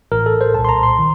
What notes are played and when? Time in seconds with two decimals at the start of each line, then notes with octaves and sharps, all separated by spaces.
0.12 A1 A2 A#4
0.26 A4
0.41 C5
0.54 C2 A#2 A5
0.65 C6
0.69 A#5
0.83 C6
0.99 D#3